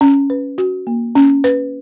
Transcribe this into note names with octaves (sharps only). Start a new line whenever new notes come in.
C#4
B4
F#4
A#3
C#4
B4